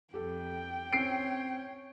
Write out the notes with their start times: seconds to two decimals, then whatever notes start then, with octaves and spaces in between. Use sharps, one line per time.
0.14 F2 G4 A4 G5
0.93 C4 C#4 C#5 C7 D7